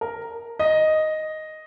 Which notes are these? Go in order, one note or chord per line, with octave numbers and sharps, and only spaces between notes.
A#4
D#5